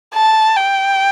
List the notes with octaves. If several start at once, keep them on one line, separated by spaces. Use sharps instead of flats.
A5
G5